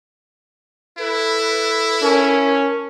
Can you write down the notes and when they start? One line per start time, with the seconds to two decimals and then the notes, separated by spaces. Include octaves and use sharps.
0.98 E4 A4 B4
2.02 C#4 A#4 A5